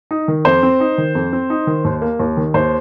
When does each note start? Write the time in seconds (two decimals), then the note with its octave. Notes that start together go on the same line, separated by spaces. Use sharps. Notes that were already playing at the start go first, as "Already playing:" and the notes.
0.11 D#4
0.28 D#3
0.45 F2 C5
0.63 C4
0.80 D#4
0.98 D#3
1.15 F2
1.33 C4
1.50 D#4
1.67 D#3
1.85 D#2
2.02 A#3
2.20 D#2
2.37 D#3
2.54 D#2 C5